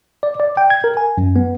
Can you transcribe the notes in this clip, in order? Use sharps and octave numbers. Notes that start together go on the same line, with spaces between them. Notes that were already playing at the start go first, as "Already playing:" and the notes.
D5
D5
G5
G#6
A#4
G#5
F#2
B3